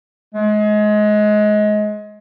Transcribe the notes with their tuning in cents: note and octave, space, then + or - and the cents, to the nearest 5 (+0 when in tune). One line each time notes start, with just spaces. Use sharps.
G#3 +25